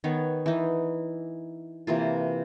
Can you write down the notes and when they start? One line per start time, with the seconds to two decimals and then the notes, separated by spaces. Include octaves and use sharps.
0.04 D#3 B3 C#5
0.46 E3 D#4
1.87 C3 E3 A#3 F4